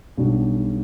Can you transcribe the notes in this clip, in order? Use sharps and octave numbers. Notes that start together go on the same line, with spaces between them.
B1 B2 G3 D4 F#4